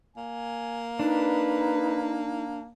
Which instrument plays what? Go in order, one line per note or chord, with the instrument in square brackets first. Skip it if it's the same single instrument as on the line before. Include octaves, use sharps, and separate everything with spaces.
[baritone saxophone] A#3 [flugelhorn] G#5
[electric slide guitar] D4 [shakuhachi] D#4 [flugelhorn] B4